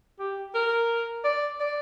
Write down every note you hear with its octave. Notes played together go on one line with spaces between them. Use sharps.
G4
A#4
D5
D5